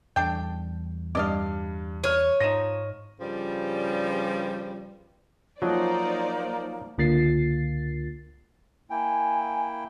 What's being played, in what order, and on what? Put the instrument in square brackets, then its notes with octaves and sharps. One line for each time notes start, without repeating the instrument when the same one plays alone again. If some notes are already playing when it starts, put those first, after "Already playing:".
[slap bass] E2 G3 [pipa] D4 A4 G5
[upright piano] G2 [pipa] D5 D#5 F5
[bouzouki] C#5 [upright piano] F6 D#7
[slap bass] G#2 [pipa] F3 D#4 [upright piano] A#6 D#7 E7
[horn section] G2 C#3 F3 G3
[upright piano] F3 [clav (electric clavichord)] F#3 D#5 [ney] A#3 [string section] D#4 C5 D5
[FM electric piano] C#2 D3 A#3 F4 A6 C7
[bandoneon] A#3 E4 G5 [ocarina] G#5